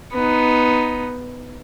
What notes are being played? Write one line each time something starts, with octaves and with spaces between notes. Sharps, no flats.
B3 D#4